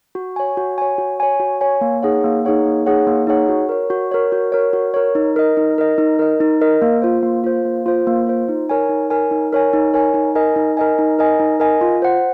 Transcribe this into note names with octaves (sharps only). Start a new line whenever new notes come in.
F#4
C#5 G#5
F#4
C#5 G#5
F#4
C#5 G#5
F#4
C#5 G#5
A#3
D#4 G#4 C#5 F#5
A#3
D#4 G#4 C#5 F#5
A#3
D#4 G#4 C#5 F#5
A#3
D#4 G#4 C#5 F#5
F#4
A#4 C#5
F#4
A#4 C#5
F#4
A#4 C#5
F#4
A#4 C#5
D#4
A#4 D#5
D#4
A#4 D#5
D#4
A#4 D#5
D#4
A#4 D#5
A#3
F4 C5
A#3
F4 C5
A#3
F4 C5
A#3
F4 C5
D#4
A#4 C#5 G#5
D#4
A#4 C#5 G#5
D#4
A#4 C#5 G#5
D#4
A#4 C#5 G#5
D#4
A#4 D#5 G#5
D#4
A#4 D#5 G#5
D#4
A#4 D#5 G#5
D#4
A#4 D#5 G#5
F4
C5 F#5